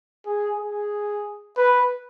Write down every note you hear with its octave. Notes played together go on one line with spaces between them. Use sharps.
G#4
G#4
B4